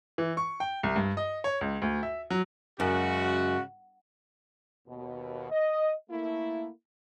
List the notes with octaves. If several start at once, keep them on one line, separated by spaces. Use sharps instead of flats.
E3
C#6
G5
C2
G2
D#5
C#5
C#2
D2
E5
F#3
F#2 C#3 G#3 F#4
D#2 B2
D#5
A3 A#3 E4